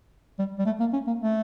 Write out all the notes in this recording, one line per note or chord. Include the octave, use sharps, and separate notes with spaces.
G3
G3
A3
A#3
C#4
A#3
A3